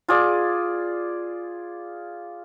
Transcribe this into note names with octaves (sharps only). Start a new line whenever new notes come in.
F4 G#4 D5